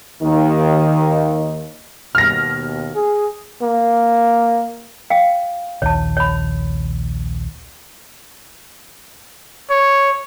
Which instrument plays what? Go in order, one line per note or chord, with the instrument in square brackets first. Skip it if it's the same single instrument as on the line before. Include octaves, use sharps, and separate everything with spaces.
[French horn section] D#2 D#3
[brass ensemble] D#2 B2 [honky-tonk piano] F6 A#6
[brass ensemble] G#4
[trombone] A#3
[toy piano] F5 G5
[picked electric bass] A#1 D#2 [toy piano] C#5 A5
[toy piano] C#5 B5
[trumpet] C#5